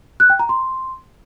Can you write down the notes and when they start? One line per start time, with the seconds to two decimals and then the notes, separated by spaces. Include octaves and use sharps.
0.20 F#6
0.30 G5
0.39 A#5
0.49 C6